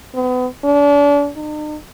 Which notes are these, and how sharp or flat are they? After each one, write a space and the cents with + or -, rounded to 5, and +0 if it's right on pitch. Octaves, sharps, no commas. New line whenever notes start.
B3 +35
D4 -35
D#4 -45